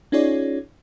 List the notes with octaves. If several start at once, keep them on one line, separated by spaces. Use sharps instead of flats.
C#4 D#4 F4 G#4 C#5 D5